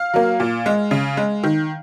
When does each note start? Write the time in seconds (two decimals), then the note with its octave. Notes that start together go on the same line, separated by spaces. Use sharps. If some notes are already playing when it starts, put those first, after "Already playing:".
Already playing: F5
0.14 F#3 A#3
0.40 A#2
0.66 G#3
0.91 C#3
1.17 G#3
1.43 D#3